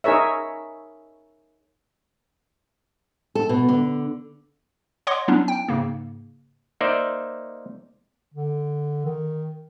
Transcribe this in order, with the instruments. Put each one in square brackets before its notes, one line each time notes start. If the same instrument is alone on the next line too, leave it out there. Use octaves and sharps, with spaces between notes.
[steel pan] D#4 G#4 A#4 C#5 E5
[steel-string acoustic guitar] A4
B2
D3
[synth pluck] C#5 D#5 F#5 C6 D6
F#3 B3 C#4 D4 E4
G5
G#2 C#3 A#3
[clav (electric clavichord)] A#3 D#4 C5 D5 E5
[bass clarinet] D3
D#3